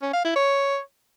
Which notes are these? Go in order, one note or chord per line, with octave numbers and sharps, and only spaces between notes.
C#4
F5
E4
C#5